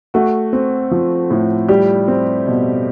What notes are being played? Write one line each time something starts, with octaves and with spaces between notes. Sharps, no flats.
A3 F#4
C4
F3
A2
G3 G4
C4
B2